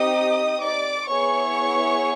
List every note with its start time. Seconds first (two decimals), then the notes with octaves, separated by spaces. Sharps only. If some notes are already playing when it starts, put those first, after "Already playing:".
Already playing: C4 D#4 G4 D#5 D#6
0.62 D5 D6
1.08 B3 E4 G#4 C#5 C#6